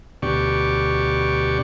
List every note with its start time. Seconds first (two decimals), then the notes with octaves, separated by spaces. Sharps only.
0.22 D2 B2 G4 D5 C#6